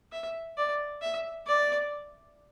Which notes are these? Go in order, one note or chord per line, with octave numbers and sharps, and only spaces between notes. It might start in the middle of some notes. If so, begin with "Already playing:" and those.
E5
D5
E5
D5